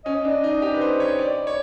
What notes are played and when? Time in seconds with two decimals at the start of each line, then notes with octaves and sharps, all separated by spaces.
0.05 C#4 D#5
0.25 D4
0.44 D#4
0.62 G4
0.74 B4
0.81 C5
1.00 C#5
1.19 D5
1.47 C#5